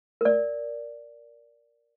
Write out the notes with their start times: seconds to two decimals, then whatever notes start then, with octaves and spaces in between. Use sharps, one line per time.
0.21 A#4 D5